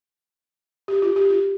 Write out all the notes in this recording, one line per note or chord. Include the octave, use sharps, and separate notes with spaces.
G4
F4
G4
F4